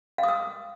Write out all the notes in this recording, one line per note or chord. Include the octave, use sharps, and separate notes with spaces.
F5
D#6
E6